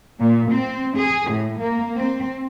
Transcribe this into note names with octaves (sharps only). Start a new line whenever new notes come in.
A#2
C4
G#4
A2
A#3
C4